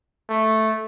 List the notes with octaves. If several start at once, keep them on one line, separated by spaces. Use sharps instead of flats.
A3